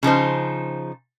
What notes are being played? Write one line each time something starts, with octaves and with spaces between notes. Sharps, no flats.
C#3 F3 D#4 C5